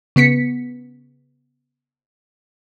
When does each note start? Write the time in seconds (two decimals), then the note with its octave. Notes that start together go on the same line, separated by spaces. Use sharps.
0.16 C#3 B3 B6 C#7